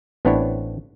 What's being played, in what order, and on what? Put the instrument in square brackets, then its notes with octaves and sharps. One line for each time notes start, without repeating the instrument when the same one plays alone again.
[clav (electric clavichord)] A1 B3 C4 D4 E4 C#5